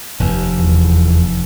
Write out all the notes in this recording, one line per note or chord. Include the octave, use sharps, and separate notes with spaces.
F1 D#2
E2